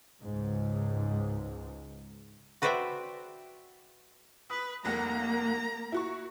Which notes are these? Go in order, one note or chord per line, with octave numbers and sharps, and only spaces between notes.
C#2 G#2
F#4 B4 C5 D5 E5 G5
B4 D#6
F1 C2 A#3 F#5 A#5
E4 F#4 C#6